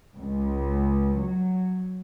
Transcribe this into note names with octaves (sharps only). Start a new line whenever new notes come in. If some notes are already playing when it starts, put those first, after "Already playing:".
C#2
F#3